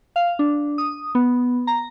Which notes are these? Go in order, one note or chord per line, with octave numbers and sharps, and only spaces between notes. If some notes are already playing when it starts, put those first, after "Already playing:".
F5
D4
D#6
B3
A#5